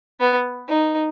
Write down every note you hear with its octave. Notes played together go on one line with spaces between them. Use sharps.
B3
D#4